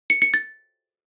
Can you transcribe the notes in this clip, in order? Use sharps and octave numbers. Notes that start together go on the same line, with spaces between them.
C#7
C#7
A6